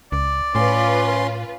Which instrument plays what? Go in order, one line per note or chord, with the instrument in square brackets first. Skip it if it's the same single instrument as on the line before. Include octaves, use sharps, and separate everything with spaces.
[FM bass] C#2 [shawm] D5
[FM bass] A2 [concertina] C#4 C6 [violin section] F4 B4